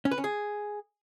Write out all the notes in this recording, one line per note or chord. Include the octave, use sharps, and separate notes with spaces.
C#4
B4
C#4
G#4